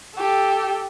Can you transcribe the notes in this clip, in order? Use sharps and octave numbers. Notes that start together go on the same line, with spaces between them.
G4 A4